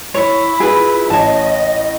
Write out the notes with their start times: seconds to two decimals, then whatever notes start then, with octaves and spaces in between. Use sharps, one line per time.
0.14 E4 C#5
0.60 F4 G#4 B4
1.10 A1 C#5 D#5 A5